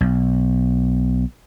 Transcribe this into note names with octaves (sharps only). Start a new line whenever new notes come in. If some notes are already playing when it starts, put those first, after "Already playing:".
B1